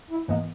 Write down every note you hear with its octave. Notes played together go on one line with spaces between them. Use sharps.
E4
G#2 E3 G#3 A#3 B3